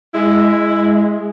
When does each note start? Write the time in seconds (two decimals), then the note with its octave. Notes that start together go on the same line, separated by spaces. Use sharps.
0.14 G#3 E4